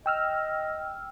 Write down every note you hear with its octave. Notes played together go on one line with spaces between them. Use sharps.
D#5 G5 E6 F6